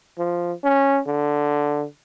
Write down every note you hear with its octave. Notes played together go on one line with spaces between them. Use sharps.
F3
C#4
D3